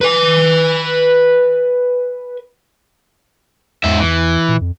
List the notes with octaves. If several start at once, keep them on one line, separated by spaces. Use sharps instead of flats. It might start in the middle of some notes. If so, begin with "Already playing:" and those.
B4 G#5
E2 G#2 E5
E3
A#2
F2